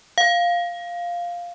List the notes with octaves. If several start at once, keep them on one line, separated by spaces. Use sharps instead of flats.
F5